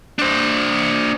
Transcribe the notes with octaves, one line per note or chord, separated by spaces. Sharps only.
D4 C5